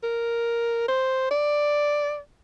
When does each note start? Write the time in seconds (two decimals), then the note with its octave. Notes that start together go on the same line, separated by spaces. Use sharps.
0.03 A#4
0.88 C5
1.31 D5